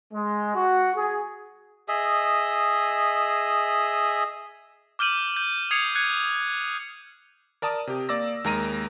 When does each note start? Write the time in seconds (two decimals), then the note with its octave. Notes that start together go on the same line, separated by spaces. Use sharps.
0.13 G#3
0.54 F#4
0.95 G#4
1.88 G#4 D#5 E5
4.99 D6 F6 G6 D#7 F#7
5.37 G6
5.71 D#6 G#6 C7 C#7 F7
5.95 F#6 G#6 C#7
7.62 A#4 D5 A5 D#6
7.87 C3 G4
8.09 A#3 D5 D6 E6 A#6
8.44 D#2 G#3 A#4 A#5 A#6 D#7